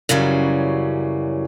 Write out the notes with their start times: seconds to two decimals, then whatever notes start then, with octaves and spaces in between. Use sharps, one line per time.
0.09 F#2 C#3 E3 F#3 G3